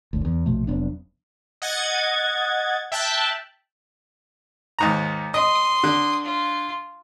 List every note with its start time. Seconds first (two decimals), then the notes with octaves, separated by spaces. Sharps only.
0.13 F#1 D2
0.25 E2
0.46 A#1 B2 F3 A3
0.67 F1 F#3 B3 D4
1.62 D#5 F#5 G#6 A6
2.92 E5 G5 A5 F#6
4.79 D#2 G#2 A#5
5.34 D#5 C6 D#6
5.83 D3
6.24 F4